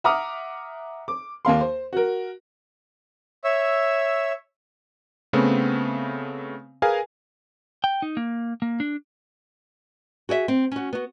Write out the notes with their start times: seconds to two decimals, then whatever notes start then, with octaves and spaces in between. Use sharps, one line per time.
0.04 E5 F#5 A#5 D6 D#6 F6
1.08 D6
1.45 D#2 A#3 F5 C6
1.61 C5
1.93 F#4 A#4
3.44 C#5 E5 E6
5.33 C#3 A3 B3 C4
6.82 G#4 A#4 B4 F5 G#5
7.84 G5
8.02 D#4
8.17 A#3
8.62 A#3
8.80 D4
10.29 F#4 G#4 D5 E5
10.48 C4
10.71 C#4 F#4
10.93 B3 F#4